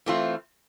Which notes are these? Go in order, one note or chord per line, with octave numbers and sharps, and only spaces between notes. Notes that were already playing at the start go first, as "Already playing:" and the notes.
E3 A3 C4 F4